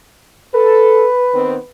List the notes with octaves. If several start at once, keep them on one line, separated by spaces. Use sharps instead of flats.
A4 B4
D#3 B3 C4